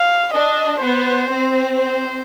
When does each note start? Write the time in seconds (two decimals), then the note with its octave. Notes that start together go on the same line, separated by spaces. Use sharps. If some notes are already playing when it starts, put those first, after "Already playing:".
Already playing: F5
0.34 D4 D#5
0.82 B3 C5
1.31 C4
1.79 C5